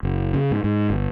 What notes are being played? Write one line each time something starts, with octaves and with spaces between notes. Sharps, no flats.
F#1
C#3
G#2
G#2
G1